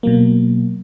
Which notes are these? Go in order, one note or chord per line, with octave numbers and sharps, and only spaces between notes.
B2 F#3 A#3